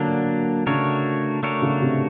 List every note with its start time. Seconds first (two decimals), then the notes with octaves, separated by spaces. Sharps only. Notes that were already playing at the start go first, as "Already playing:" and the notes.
Already playing: D3 F#3 A#3 D4
0.66 C#3 A3 D4 F#4 A#4 C#5
1.43 A3 D4 F#4 A#4 C#5
1.62 C#3
1.81 C3